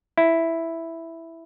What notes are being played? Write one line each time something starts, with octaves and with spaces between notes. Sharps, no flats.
E4